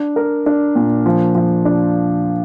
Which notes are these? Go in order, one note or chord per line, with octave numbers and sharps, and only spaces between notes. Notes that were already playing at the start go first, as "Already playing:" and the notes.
Already playing: D4
A#4
D4
A#2
F3
F3
D4